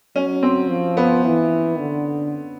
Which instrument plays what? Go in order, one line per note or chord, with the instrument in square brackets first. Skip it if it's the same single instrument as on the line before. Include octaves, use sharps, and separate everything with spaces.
[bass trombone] F#3 [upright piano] C#4
[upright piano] C4
[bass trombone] F3
[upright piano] B3
[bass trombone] E3
D3